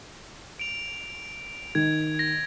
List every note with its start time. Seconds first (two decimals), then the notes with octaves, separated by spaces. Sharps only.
0.59 D7 F7
1.75 D#3 G#6
2.19 A#6